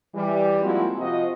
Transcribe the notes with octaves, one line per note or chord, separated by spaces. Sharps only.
E3 G3
F3 G#3 A#3 C4 E4 F#4
C3 F3 F4 F#4 D#5